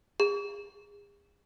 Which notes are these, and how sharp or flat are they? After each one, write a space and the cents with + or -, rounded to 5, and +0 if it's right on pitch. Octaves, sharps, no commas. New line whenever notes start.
G#4 -35